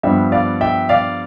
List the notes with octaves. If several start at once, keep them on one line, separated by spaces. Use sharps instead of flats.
G2 F3 B3 E5 G5
D5 F5
E5 G5
D5 F5